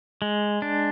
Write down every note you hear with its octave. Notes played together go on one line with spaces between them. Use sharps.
G#3
D4